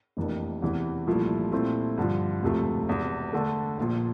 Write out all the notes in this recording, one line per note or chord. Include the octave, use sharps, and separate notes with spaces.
F1 F2 E3 A#3 D4
E2 C3 E3
C2 A#2 F3 A3 E4
A#2 A3 C4 E4
G2 D3 F3
E1 D2 C3 F3 A3
E1 E2 C3
D3 A3 D4 A4
A#1 A#2 F3